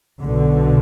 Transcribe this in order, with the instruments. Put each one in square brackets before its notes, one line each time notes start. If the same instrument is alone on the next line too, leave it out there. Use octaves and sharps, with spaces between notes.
[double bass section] B1 B2 D3